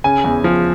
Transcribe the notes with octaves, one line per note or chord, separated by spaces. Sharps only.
C#3 G#5
E2
F3